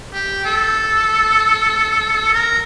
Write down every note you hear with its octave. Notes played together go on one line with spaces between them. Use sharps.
G4
A4
A#4